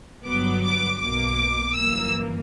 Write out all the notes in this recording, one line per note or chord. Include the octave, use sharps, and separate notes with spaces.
G1 G2 F#3 B3 D6
D6
B1 B2 A#3 D6
G1 F#2 E3 A#3 E6